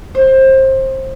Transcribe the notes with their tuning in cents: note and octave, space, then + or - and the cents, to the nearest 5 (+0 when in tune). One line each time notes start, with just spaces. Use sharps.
C5 +25